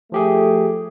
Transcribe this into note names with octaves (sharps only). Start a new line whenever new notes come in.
F3 A3 G4 G#4